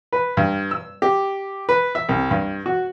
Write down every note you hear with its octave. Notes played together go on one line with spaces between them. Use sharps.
B4
G2
E6
G4
B4
E5
C2
G2
F#4